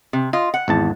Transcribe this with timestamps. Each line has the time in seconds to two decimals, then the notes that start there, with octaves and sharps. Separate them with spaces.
0.13 C3
0.33 F4 D#5
0.54 F#5
0.68 G#1 E2 A5